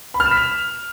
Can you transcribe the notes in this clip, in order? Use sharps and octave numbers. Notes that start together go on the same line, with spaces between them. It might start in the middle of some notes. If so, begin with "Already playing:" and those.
B5
F6
E7
B6
F7